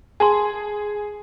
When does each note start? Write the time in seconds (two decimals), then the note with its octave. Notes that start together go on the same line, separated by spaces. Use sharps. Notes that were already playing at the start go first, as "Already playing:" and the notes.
0.20 G#4 G#5 A5 C6